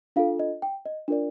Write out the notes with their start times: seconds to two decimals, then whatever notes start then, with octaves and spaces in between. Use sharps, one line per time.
0.16 D4 F4 A4 F5
0.39 D#5
0.62 G5
0.85 D#5
1.08 D4 F4 A#4 D5